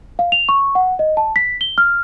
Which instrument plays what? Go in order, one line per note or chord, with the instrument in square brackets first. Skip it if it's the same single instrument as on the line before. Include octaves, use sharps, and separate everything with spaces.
[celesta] F5
F7
C#6
F#5
D#5
A5
B6
G7
F6